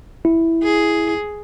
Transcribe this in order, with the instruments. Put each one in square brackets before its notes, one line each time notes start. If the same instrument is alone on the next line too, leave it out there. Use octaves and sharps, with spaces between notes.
[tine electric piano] E4
[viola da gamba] G#4